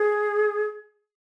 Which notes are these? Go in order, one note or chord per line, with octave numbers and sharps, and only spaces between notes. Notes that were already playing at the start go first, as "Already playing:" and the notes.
Already playing: G#4